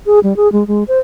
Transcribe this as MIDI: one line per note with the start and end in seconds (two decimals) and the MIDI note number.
0.06 0.19 68
0.23 0.36 55
0.36 0.51 68
0.52 0.66 56
0.67 0.84 56
0.88 0.99 72